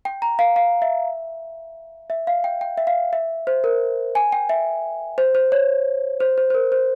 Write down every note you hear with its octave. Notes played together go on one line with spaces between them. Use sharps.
G5
A#5
F5
F5
E5
E5
F5
G5
G5
E5
F5
E5
C5
A#4
G#5
G5
E5
C5
C5
C#5
C5
C5
C5
A#4
C5